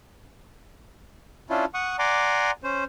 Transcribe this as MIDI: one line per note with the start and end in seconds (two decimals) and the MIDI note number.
1.50 1.65 61
1.50 1.65 62
1.50 1.65 64
1.50 1.65 65
1.74 1.96 78
1.74 1.96 85
1.74 1.96 87
1.99 2.51 74
1.99 2.51 78
1.99 2.51 80
1.99 2.51 82
1.99 2.51 84
1.99 2.51 86
2.63 2.84 61
2.63 2.84 72